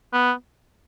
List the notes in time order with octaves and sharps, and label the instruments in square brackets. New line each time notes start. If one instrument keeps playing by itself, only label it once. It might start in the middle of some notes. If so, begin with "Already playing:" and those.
[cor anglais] B3